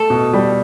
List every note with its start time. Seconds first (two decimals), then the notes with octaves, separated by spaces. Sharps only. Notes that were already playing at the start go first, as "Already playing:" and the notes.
Already playing: A3 A4
0.10 B2
0.33 G3